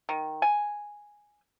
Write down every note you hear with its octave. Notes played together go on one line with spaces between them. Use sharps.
D#3
G#5